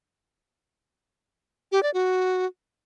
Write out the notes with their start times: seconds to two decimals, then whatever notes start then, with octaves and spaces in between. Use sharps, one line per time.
1.72 G4
1.83 D5
1.94 F#4